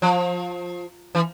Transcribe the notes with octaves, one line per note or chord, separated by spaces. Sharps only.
F3
E3